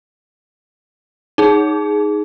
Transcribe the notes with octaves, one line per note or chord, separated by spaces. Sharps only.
D#4 G#4